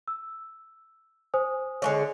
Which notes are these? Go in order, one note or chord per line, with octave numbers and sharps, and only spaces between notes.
E6
C5 G#5 D#6
D3 G#3 C#5